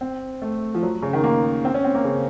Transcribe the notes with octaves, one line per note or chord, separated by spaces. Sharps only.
C4
A3
F3
F#3
C#3
D#3
A#3
C4
C#4
C4
A#3
C#3